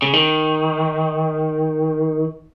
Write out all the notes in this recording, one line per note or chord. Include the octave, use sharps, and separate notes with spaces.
C#3
D#3